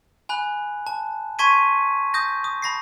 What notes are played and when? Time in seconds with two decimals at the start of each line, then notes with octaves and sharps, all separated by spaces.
0.29 G#5 B5 F#6
0.87 A5
1.39 A5 C6 C#6 G#6 B6 D#7
2.14 D#6 G6 A#6
2.44 D#6
2.62 A5 B5 A#6 C7